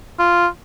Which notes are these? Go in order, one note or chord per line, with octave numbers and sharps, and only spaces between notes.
F4